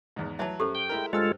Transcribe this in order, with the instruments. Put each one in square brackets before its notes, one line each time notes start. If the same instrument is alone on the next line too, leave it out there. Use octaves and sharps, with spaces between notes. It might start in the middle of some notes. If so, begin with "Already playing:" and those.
[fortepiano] E2 G#2
[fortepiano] E3 F#3 [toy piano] E5 A5
[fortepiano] F#2 [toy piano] G4 A4 C5
[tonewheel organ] G5
[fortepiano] G#3 E4 A#4
[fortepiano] G2 E6 F6 [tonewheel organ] G#3 F4 A4 [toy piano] C5